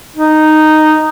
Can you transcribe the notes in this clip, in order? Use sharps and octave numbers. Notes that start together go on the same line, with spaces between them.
D#4